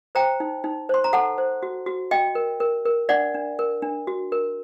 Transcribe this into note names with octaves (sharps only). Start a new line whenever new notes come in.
C5 G5 A#5
D#4
D#4
C5 C6
A#5
A4 F#5 A5
C5
F#4
F#4
F#4 D#5 G5
A#4
A#4
A#4
D4 D5 F#5
D4
A#4
D4
F#4
A#4